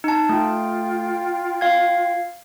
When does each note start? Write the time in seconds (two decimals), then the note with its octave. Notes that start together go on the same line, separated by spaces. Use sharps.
0.04 D#4 A5
0.29 A3 F4 G5
1.61 F5 G#6